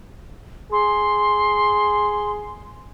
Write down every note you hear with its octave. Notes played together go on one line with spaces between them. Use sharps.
G#4 C6